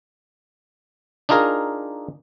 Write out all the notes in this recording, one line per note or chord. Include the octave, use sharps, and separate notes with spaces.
D4 D#4 F4 G#4 A#4